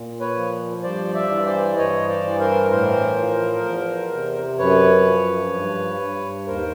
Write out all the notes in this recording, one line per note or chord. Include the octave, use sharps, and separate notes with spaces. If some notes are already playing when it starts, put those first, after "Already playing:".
Already playing: A#2
B4 C#5
F3
G2 C5 D5
D5 E5
E3
C5 D5
G2 C#5 D#5
C5 D5
E3
A#4 C5
A2 A#4 C5
F3
E2
C3
F#2 B4 C#5
F3
G2
G2
D#2 A#4 C5